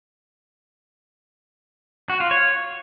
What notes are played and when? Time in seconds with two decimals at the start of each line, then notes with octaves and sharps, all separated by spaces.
2.10 F#4
2.20 F4
2.31 C#5